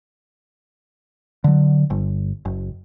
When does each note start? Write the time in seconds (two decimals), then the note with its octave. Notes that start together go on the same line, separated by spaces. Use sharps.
1.44 D3 F#3
1.90 G1
2.45 F#1